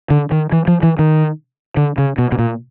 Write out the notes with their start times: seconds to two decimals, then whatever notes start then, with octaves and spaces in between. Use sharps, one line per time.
0.10 D3
0.32 D#3
0.52 E3
0.68 F3
0.83 E3
0.99 D#3
1.77 D3
1.98 C#3
2.18 B2
2.32 B2
2.39 A#2